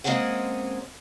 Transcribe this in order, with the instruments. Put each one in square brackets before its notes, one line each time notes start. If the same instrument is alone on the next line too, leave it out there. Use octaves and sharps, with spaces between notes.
[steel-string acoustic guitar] G#3 A#3 C4 C#4 G#4 F#5